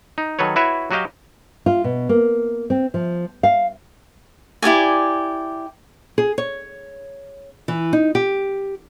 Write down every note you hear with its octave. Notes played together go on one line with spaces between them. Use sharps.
D#4
D#3 F#3 A4 B4 C#5
E4 F#4 B4 C#5 E5
F#3 F#4 G4 D#5 F5 G5
F4
B2
A#3
C4
F3
F5
E4 G4 D5 G#5
G#4
C#5
E3
D#4
G4